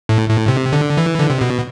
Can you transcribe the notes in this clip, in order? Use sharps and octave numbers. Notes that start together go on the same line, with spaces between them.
A2
A2
C3
D3
E3
D3
C3
B2